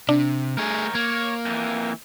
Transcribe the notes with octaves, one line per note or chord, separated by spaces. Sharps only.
C3 D4
A3 G#4 A#4 C#5
A#3 C#5
F2 E3